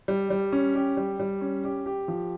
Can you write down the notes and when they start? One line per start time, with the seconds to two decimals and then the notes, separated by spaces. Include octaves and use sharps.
0.08 G3
0.30 G3
0.52 C#4
0.75 G4
0.97 G3
1.20 G3
1.41 C#4
1.64 G4
1.86 G4
2.08 F3